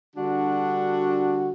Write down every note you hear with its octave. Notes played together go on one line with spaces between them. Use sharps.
D3 G3 D4 F#4